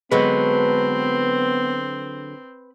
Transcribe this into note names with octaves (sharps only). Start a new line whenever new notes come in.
D3 F#3 G#3 B3 C4 B4